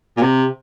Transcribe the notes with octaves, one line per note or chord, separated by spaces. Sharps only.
A#2
C3